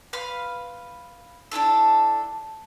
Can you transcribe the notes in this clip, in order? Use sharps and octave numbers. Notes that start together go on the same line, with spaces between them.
B4 F5 B5 C6
D4 E4 F4 A4